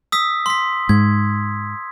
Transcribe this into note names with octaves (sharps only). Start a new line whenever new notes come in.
D#6 E6 B6
C6 B6
G#2 G#6